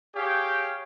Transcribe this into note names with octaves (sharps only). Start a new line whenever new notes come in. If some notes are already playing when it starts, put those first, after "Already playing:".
G4 G#4 C#5 F5 G5